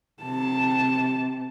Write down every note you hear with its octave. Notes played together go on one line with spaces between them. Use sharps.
C3 A5